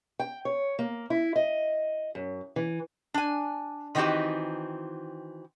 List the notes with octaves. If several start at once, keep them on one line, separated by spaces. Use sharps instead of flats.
G5
C#5
A#3
E4
D#5
F#2
E3
D4 G#5
D#3 E3 C4 D#4 F#4 G4